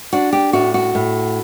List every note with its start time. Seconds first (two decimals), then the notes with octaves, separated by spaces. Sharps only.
0.13 D4 F#4
0.33 G4
0.53 A2 F#4
0.74 F#4
0.95 A2